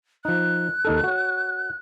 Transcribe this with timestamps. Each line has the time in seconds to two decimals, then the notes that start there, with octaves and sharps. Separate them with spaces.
0.25 F3 D#4 F#6
0.85 D#2 D#4 A4
1.04 F#4 C#5